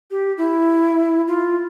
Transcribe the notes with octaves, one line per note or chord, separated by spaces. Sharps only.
G4
E4
F4